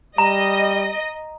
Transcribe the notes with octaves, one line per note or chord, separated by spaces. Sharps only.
G3 D#5 A#5